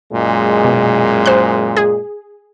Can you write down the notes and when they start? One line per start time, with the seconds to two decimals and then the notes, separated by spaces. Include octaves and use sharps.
0.12 F#2 A#2 G#3
0.65 B2
1.26 C5 F#6
1.77 G#4